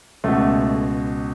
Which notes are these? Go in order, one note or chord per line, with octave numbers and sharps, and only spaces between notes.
C#2 B2 A3